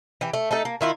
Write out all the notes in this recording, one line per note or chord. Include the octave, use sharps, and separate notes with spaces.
E3 G4
A3
A3 D#4 A4
A#3
D#3 E4 F4